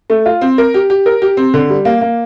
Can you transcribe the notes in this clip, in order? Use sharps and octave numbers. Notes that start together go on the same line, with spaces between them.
A3
F4
C4
A#4
G4
G4
A#4
G4
C4
D3
G3
A#3
A#3